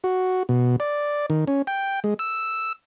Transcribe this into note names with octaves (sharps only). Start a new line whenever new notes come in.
F#4
B2
D5
D#3
C#4
G5
G#3
E6